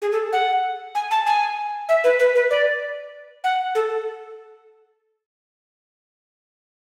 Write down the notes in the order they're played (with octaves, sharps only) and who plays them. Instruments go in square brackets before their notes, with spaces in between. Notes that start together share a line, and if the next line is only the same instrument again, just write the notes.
[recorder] G#4
A4
F#5
G#5
A5
G#5
E5
B4
B4
B4
D5
F#5
A4